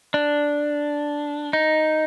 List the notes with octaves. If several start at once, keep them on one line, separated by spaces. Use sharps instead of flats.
D4
D#4